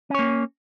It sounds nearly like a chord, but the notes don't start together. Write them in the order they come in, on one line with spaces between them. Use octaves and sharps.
C#4 C#5 A#3